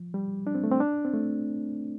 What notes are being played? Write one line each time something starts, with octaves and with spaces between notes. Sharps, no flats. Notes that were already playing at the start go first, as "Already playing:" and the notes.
Already playing: F3
G3
D4
C4
A3
C4
D4
C4
A3